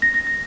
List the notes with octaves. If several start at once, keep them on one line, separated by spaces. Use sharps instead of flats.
A#6
A#6
A#6